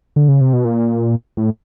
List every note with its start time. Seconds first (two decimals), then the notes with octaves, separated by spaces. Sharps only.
0.16 D3
0.28 C#3
0.41 C3
0.53 B2
0.65 A#2
1.37 A2